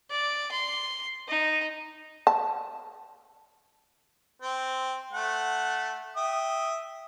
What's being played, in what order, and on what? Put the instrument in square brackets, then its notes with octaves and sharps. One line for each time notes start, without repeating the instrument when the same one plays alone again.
[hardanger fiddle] D5
C6
D#4
[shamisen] A5
[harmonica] C4
A3 F#5
E5 G5 D#6